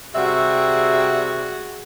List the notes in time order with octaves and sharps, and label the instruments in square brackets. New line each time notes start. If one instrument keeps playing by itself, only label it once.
[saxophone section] C3 G3 E5 [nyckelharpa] F#4 G#4